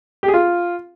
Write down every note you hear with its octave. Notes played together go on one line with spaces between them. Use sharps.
G4
G#4
F4